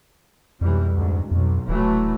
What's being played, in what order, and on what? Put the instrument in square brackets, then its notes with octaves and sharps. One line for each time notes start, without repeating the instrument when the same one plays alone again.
[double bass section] B1 E3 G3 [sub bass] F2
[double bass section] D2 G#2
[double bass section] B1 [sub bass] F2
[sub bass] D#1 [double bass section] E3 F#3 A3